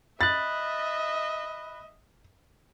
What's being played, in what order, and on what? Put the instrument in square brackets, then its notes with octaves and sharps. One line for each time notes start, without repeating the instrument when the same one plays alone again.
[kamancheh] D#5 E5 [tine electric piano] B5 F#6 [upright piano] A6